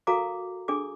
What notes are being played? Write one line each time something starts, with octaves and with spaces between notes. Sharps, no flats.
F#4 A4 A#4 F5 A#5 D6
D4 G#4 A4 D6